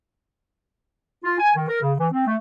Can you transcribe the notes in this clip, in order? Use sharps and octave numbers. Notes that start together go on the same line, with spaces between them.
F4
G#5
D#3
A#4
C#3
E3
C4
A3